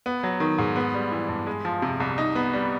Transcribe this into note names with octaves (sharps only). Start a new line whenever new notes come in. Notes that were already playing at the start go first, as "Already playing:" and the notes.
B3
F#3
D#3
G#2
B3
G3
E3
G2
G#3
F3
C3
C2
D#4
B3
G3